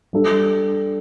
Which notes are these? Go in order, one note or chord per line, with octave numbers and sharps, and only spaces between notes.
G3 D4 A4